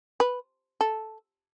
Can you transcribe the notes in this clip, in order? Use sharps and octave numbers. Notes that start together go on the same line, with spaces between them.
B4
A4